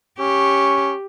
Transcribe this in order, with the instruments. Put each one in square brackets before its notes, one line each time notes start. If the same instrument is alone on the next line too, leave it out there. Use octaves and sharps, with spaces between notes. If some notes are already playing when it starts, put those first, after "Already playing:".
[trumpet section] C#4 C#6 [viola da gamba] G4